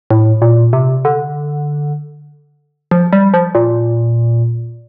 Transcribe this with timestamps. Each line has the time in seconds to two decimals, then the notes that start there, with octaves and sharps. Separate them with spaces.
0.10 A2
0.42 A#2
0.73 C3
1.05 D3
2.91 F3
3.13 G3
3.34 F3
3.55 A#2